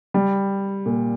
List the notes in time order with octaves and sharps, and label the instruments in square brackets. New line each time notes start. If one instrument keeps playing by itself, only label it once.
[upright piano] G3
A#2